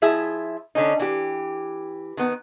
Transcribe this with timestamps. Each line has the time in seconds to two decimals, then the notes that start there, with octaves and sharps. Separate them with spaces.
0.02 F3 E4 G#4 E5
0.75 D3 C#4 D#4
1.00 E3 G4
2.17 D#3 B3